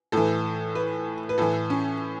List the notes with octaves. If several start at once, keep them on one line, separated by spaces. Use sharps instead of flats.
A2 E3 A4
B4
B4
A2 E3 A4
C#4